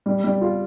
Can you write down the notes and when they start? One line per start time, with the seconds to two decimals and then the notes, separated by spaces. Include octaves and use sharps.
0.06 G3
0.24 G3
0.41 F4